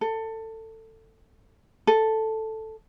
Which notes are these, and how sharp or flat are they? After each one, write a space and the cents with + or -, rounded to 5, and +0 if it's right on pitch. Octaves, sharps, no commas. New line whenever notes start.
A4 +20
A4 +0